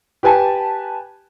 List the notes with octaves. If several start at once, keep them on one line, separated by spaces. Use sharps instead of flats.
G4 B4 G#5 A5